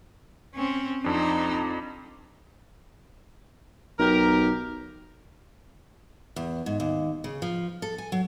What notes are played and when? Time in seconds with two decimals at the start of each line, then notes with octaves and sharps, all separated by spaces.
0.55 C4 C#4
1.04 F2 C4 D4 D#4
3.99 B1 G4 A#4
6.36 E2
6.66 G#2
6.80 D#2
7.24 C#3
7.42 F3
7.82 A4
7.98 G#5
8.12 F#3